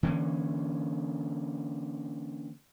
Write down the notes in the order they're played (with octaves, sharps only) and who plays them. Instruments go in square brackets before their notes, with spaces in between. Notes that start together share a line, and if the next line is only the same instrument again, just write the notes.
[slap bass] D3 E3 A#3 C#4